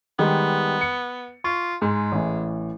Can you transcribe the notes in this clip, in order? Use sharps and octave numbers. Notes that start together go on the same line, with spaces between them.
D#3 G3 G#3 B3
C#7
F4 C#6
G#2 G#3
A1 E3